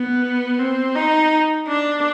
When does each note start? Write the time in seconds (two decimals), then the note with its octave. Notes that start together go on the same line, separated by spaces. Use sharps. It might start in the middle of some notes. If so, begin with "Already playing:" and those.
Already playing: B3
0.59 C4
0.95 D#4
1.68 D4